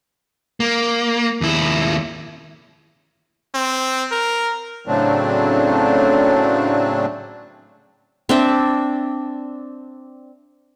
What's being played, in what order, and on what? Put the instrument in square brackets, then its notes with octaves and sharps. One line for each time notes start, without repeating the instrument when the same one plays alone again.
[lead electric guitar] A#3
D#2 E4
[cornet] C4
A#4
[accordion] A2 C#3 F#3 A3 C4 D4
[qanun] C4 D4 E5